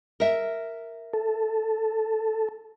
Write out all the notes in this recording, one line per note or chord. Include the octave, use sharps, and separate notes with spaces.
A#4 E5
A4